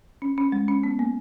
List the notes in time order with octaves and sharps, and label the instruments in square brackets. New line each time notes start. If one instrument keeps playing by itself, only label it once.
[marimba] C#4
C#4
G#3
C#4
B3
A#3